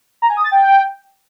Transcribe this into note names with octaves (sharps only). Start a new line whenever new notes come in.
A#5
G#5
D#6
A6
G5